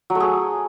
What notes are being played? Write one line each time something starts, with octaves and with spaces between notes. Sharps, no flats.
F#3
A3
G#4